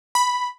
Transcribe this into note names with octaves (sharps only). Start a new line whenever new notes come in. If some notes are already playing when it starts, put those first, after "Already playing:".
B5